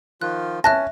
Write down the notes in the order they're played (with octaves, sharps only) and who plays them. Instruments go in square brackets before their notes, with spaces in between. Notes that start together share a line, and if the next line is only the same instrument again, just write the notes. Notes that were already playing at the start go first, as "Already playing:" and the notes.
[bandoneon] D#3 F3 F4 [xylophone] F#6
[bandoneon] C#4 [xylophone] E5 F#6 A#6 [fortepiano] A5